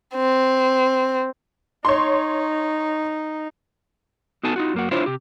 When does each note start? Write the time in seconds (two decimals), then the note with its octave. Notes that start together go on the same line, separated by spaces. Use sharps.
0.15 C4
1.85 D#4 C#5 C6
4.43 B3 D#4 F#4 A4 G#5 A5
4.56 D#4 F4 F#4
4.74 F#2 A#3 F#4
4.91 D4 E4 F4 C5 C#5
5.06 C3 G4